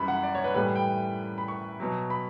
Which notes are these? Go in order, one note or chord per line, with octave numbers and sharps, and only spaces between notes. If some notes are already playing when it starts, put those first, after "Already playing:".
Already playing: F#2 E3 G3 B5
F#5
D5
C#5
B4
A2 E3 G3 B4
G5
B5
C#6
B2 F#3
B5